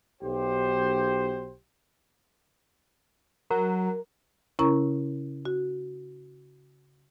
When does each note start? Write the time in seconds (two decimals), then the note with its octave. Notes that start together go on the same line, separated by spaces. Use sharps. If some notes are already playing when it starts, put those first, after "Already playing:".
0.22 B1 G4 C5
3.50 F#3 A#4
4.59 C#3 C#4 E4 A#4 A#5 C#6
5.45 F#4